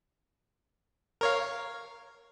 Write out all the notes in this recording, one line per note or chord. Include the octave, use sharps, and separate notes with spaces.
A#4 C#5 F5